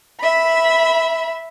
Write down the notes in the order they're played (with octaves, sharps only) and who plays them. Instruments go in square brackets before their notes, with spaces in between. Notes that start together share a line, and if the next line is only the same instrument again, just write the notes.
[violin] E5 B5